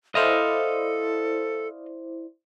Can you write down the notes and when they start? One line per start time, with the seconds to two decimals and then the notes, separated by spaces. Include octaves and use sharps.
0.15 E4 A4 C5 D5 D#5 F5